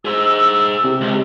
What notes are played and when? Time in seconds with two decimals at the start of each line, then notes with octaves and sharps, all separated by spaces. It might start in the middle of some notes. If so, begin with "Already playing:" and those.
0.05 G#4 C5 E6
0.84 C3
1.01 C#2